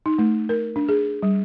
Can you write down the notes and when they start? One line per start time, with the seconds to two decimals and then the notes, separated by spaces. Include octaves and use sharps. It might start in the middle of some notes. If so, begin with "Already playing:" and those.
0.06 D#4
0.18 A3
0.49 A#4
0.76 D4
0.89 G#4
1.22 G3